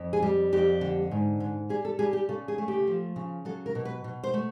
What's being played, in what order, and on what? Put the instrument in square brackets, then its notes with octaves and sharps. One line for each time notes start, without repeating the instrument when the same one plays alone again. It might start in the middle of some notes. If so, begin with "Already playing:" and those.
Already playing: [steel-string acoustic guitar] F2
G#4
G3
F2 G4
D3
G#2
G#2
G3 G#4
A4
G3 G#4
G4
C#3 A4
G#4
A3
G4
F3
C#3
F#3 A4
A#4
B2
B4
B2
C5
A3